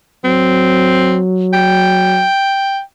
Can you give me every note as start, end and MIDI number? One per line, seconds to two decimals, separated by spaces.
0.24 2.26 54
0.24 1.19 60
1.53 2.80 79